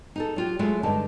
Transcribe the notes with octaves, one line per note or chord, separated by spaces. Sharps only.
D#4 G#4 A4
F#3 F4 G4
F#3 G#3 A3 E4 F4 G#4
G2 D3 G#3 D#4 A5